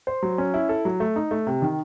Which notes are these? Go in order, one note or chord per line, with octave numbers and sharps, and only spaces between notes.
C5
F#3
C#4
E4
A4
F#3
A3
D#4
A3
C3
D#3